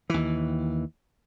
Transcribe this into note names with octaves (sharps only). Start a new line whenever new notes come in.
D#2 E3